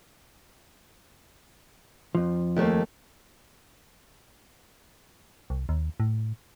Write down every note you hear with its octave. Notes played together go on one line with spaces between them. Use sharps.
F2 F3
D#2 A3 A#3
C2
D#2
A2